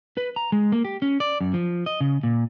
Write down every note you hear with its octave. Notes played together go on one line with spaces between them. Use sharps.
B4
A#5
G#3
A#3
G4
C#4
D5
F#2
F3
D#5
C#3
A#2